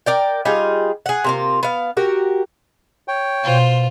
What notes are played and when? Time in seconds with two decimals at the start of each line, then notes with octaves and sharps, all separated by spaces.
0.06 A#4 D5 G5
0.45 G3 D#4 F4 G#4
1.06 G#4 F#5
1.24 C3 A#3 F4
1.63 B3 F5
1.97 F#4 G4 A#4
3.08 C#5 G5
3.44 B2 F4 C5